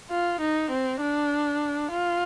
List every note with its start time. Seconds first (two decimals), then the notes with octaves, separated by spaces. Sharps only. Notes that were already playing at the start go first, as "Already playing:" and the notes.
0.11 F4
0.41 D#4
0.71 C4
1.01 D4
1.91 F4